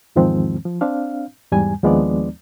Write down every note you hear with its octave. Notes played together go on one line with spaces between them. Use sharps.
E2 G#2 D#3 F3 G#3 C4
F3
C4 D4 F5
E2 G#2 G3 G#5
D#2 F3 G#3 B3 D4 D5